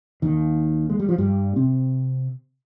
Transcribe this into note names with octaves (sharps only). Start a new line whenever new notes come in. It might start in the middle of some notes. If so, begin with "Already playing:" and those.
D#2 D#3
G#3
G3
F3
G2 G3
C3 C4